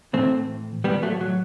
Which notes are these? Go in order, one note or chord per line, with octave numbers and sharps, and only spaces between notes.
A2 E3 A3 C4
A2 E3 G3 B3
F#3 A3
F#3